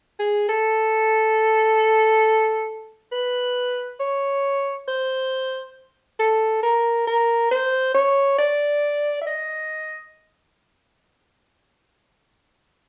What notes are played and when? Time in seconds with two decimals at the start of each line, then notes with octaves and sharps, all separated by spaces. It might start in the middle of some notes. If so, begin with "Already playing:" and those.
0.20 G#4
0.49 A4
3.12 B4
4.00 C#5
4.88 C5
6.20 A4
6.63 A#4
7.07 A#4
7.51 C5
7.94 C#5
8.38 D5
9.21 E5
9.27 D#5